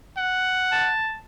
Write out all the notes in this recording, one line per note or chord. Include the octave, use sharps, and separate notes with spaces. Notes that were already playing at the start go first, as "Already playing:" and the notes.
F#5
A5